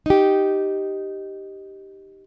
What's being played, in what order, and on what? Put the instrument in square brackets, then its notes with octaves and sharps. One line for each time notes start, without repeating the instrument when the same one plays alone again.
[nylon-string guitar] D#4 G4